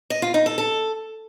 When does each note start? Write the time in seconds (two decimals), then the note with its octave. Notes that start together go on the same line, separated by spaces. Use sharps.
0.10 D#5
0.22 F4
0.34 D#4
0.46 A4
0.58 A4